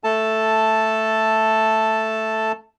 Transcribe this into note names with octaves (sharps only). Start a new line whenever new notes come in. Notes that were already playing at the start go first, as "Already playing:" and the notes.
A3 A4 A5